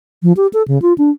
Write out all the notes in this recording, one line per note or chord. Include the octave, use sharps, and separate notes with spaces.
F3
G4
A4
C#3
F4
D4